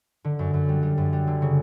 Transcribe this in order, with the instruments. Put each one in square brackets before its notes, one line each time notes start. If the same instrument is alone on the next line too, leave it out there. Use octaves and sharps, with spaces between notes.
[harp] D3
F#2
F#2
G3
G3
F#2
G3
D3
C#3